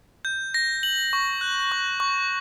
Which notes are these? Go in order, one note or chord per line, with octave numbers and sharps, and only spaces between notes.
G6
A#6
F#7
C#6
F#6
C#6
C#6